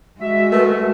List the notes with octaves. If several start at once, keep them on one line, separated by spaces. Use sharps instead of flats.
G#3 F#4 E5
A3 A#4 B4